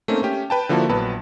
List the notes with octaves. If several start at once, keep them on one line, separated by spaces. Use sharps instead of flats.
A3 A#3 C4 C#4 D#4
A3 C#4 G4
B4 G5 A5
D3 F3 A#3 E4 F#4 A4
A#1 F#3 B3 B4 A5 B5